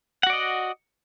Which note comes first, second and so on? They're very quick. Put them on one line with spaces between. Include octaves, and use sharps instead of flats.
F#5 F#4 D5 D#5